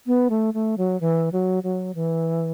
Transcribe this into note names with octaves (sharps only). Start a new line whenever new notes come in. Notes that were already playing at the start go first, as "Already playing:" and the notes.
B3
A3
A3
F#3
E3
F#3
F#3
E3